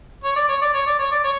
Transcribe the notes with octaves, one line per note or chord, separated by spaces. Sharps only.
C#5
D5
C#5
D5
C#5
D5
C#5
D5
C#5